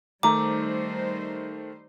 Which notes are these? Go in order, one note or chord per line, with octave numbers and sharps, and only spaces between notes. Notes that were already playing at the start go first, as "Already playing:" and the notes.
D#3 G3 A3 D#4 C5 A#5 D6